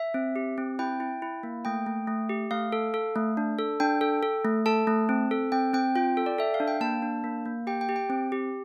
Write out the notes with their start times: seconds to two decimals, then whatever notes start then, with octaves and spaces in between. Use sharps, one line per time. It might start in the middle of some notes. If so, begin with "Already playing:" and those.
Already playing: E5
0.14 C4
0.36 G4
0.58 C4
0.79 E4 G5
1.00 E4
1.22 E4
1.43 A#3
1.65 A3 G5
1.87 A3
2.07 A3
2.29 G4
2.51 A3 F5
2.72 A4
2.94 A4
3.16 A3
3.37 D4
3.59 A4
3.80 D4 G5
4.01 A4
4.23 A4
4.45 A3
4.66 A4 A5
4.87 A3
5.09 C4
5.31 A4
5.52 C4 G5
5.73 C4 G5
5.96 F4 G5
6.17 A4
6.26 D5
6.38 A4 E5
6.54 F5
6.60 D4
6.68 G5
6.81 A#3 A5
7.02 D4
7.24 A#3
7.45 A#3
7.67 G4 G5
7.81 G5
7.89 G4
7.96 G5
8.10 C4
8.32 G4